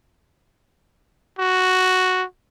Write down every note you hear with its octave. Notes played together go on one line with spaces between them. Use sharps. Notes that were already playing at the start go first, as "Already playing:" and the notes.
F#4